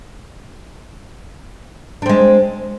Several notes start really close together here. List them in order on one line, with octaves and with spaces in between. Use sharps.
D4 C4 G#3